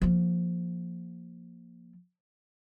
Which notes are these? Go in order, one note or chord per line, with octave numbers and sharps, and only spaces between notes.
F3 A#3